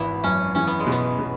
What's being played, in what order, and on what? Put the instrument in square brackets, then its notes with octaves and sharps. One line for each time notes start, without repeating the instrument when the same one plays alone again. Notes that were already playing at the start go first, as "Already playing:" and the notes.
Already playing: [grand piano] G#1 E3 [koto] B3 E4 F#4
[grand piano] F#2 [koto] C#4
[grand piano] E3 [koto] C#4
[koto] B3
G#3
[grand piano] B2
[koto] B3
[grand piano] B2